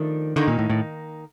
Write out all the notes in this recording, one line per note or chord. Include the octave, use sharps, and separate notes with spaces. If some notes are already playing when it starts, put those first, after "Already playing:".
Already playing: D#3 F3 A3 D4
D3 D#3 A#3 D#4
A#2
A2
A2